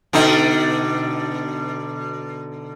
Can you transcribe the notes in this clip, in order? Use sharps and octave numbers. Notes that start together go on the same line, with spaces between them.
B2 D3 D#4